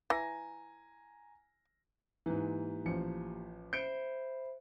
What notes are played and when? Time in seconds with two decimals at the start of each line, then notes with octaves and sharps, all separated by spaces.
0.10 E3 G#5 A#5 A#6
2.26 G#2 E3 A#3 G4
2.86 A1 F3 C#7
3.73 C5 E5 B5 G6 C#7 D7